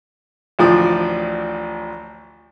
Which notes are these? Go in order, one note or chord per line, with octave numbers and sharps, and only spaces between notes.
A1 D2 F3 F4 D5 D#6